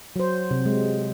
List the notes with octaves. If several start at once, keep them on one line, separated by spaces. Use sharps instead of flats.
F#3 C5
C3
G#3